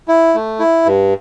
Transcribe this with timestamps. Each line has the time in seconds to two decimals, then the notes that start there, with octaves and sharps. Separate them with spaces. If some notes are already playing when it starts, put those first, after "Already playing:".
0.08 E4
0.35 A3
0.59 E4
0.86 G2